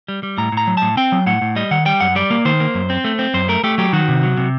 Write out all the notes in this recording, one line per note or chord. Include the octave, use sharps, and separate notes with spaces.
G3
G3
A2 A#5
A2
A#5
F#3
A2 A5
C4 G5
F#3
A2 F#5
A2
G3 D#5
D#3 F#5
G3 G5
F#2 F#5
G3 D5
A#3
D#3 C5
A#3
F#2
C4
A3
C4
F#2 C5
A3 A#4
A3 G4
F#3 G4
D#3 F#4
C3
F#3
C3